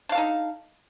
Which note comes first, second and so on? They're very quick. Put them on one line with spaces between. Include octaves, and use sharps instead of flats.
D4 F5 A4 D#4